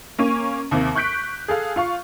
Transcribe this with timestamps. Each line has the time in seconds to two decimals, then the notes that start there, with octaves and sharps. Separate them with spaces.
0.19 A#3 C#4 D#7
0.71 D#2 C3 A#3
0.95 C#6 F#6 G6 B6 D7
1.48 G#4 A4 F5
1.76 F4 F5 C#6